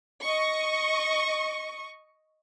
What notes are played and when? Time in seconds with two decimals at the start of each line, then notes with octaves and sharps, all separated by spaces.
0.22 D#5 C#6